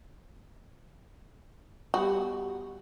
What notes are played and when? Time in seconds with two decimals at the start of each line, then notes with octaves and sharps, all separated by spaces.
1.94 G3 B3 F#4 G4